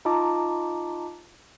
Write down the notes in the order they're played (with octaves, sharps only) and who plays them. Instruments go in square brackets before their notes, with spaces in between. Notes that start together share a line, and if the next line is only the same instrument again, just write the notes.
[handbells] D#4 F4 D#5 A5 A#5 D6